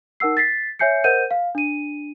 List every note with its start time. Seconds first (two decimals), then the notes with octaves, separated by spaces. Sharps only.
0.20 D#4 A#4 F#5 E6 C7
0.37 A6 B6 C7
0.79 C#5 E5 G#5 G6 C7 C#7
1.04 A#4 C5 D#5 F#5 G6 D#7
1.31 F5
1.55 D4 D#7